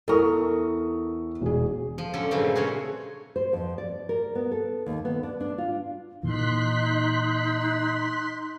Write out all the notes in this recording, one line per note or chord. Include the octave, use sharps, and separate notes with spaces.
E2 A4 A#4 C#6 D#6
E1 G#4
F3
D3 F#3 C#4 A4
G2 A#2 C#3 F3 A3 C4
C#4 F#4 G#4 A4 C#5
C5
F2
D5
A#4
B3
A4
D#2
B3
D4
D4
F4
A#2 E3 D#4 C6 F#6 B6